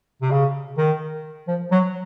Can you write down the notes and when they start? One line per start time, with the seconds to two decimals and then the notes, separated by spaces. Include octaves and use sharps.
0.21 C3
0.31 C#3
0.78 D#3
1.48 F3
1.71 F#3